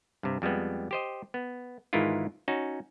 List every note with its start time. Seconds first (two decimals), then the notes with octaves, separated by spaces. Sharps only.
0.23 G2 C3
0.42 F2 G3 G#3 B3
0.91 G4 C5 D#5
1.34 B3
1.93 G#2 D#3 E3 G#3 E4 F4
2.48 C#4 D#4 F#4